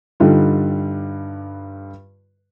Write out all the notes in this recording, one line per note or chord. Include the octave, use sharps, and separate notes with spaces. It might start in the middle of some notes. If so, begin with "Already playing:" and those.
G2 D3 G3 D#4 F4